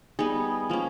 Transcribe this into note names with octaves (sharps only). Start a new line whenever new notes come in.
G3 B3 D#4 G#4
F3 A#3 C#4